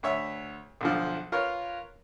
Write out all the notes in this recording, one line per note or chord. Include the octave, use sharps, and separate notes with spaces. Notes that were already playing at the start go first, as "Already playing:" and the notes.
D2 C#5 E5 E6
B1 D3 F3
F4 A#4 B4 C#5